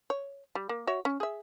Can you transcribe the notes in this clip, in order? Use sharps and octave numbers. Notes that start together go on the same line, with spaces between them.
C#5
G3
A#3
F#4 C#5 E5
C#4
G#4 E5